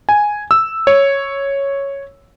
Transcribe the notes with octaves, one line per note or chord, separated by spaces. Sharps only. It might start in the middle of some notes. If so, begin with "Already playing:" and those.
G#5
E6
C#5